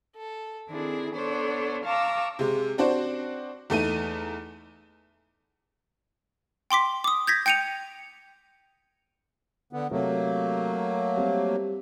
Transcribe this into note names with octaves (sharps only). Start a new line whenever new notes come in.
A4
D#3 C4 D4 E4 G#4 A4
B3 D4 A4 C5 C#5
F5 A5 A#5 C#6 D6 E6
C3 G#3
C4 D4 F#4 C5
E2 A3 D#4 D#7
G5 C6 D6 B6
D6 D#6
G6 G#6 A#6 B6
G5 G6 C#7 D#7 F7
D3 B3
C3 F#3 A3 A#3
G3 C4